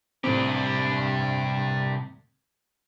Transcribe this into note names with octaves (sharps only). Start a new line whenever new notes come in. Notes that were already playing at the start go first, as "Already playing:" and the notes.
C2 A2 C4 D4 G4